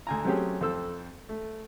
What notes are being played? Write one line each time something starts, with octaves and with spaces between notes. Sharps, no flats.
D2 G#5 A#5
F#3 A3 C4 C#4 G4 G#4
F2 C4 A4 E6
A3